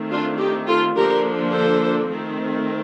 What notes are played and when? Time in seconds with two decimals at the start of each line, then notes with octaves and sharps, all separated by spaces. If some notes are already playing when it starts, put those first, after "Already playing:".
Already playing: D#3 A3 C4
0.10 D4 F4
0.39 D#4 G4
0.67 F4 A4
0.95 D3 F3 A#3 D4 G4 A#4
1.52 A4 C5
2.09 D#3 A3 C4